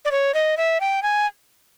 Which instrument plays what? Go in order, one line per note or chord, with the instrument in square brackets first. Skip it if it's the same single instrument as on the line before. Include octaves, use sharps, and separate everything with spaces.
[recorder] D5
C#5
D#5
E5
G5
G#5